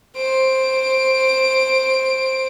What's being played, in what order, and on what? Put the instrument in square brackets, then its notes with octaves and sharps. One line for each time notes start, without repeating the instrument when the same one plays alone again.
[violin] C5 D7